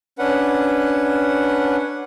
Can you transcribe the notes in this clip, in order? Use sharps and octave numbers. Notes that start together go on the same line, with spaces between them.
C#4 D4 B4 F#5